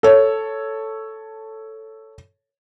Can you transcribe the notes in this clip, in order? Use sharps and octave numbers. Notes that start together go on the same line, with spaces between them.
A4 C#5